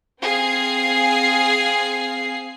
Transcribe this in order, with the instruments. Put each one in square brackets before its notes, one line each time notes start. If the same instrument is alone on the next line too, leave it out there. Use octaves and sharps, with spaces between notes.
[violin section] C4 G#4 F5 C7